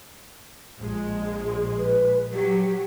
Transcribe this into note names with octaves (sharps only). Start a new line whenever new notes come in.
A#1 G#3
B4
F#3 G4